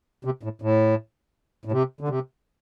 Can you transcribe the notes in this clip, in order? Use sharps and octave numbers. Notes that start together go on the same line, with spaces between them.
C3
A2
A2
A2
C3
D3
C3